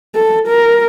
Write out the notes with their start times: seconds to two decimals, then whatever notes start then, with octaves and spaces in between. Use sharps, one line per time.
0.15 A4
0.47 A#4